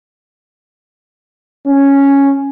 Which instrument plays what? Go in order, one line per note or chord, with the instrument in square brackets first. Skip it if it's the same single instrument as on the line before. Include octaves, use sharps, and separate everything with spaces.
[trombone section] C#4